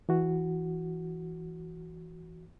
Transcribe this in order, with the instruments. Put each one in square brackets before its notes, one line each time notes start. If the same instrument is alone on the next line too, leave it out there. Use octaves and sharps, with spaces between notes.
[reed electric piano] E3 F#4